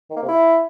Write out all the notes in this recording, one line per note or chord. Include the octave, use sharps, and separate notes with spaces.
D#3
A#3
C3
E4